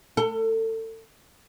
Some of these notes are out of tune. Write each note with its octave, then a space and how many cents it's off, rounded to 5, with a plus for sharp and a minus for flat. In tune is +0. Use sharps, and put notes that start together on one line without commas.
A4 +30